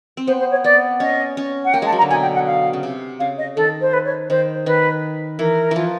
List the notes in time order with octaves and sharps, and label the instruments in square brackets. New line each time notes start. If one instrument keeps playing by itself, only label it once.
[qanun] C4
[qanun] B3 [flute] C5
[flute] C5
C#5
[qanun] B3 [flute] D5
[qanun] C#4 [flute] D#5
[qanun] C#4
[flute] F#5
[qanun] A#3 [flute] G5
[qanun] G#3 [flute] A5
[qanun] F#3
[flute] A#5
[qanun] D3
[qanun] B2 [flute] G#5
[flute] G5
F#5
F5
[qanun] C#3
C3
[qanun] C#3 [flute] F5
[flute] D#5
[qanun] D#3 [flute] A4
[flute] C5
B4
C#5
[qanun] D#3 [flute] C5
[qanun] D#3 [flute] B4
[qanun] E3 [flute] A#4
[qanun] E3 F3